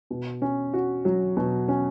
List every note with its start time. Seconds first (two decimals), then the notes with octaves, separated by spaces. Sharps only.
0.10 B2
0.42 C#4
0.73 F#4
1.05 F#3
1.37 B2
1.68 C#4